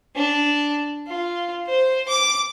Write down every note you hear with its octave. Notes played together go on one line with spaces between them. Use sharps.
D4
F4
C5
D6